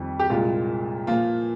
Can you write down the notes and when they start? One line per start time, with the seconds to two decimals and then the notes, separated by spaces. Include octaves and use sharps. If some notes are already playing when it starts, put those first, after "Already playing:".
Already playing: F2 D#3 G3
0.20 G4
0.30 C2 A#2 G#3 F4
1.07 A#2 F3 A#3 F4